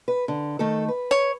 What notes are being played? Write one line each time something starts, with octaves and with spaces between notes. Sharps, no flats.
B4
D3
D#3 A3 A4
B4
C#5